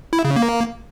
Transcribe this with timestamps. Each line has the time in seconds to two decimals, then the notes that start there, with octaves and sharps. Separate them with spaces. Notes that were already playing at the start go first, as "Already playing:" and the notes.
0.13 E4
0.25 C#3
0.36 A#3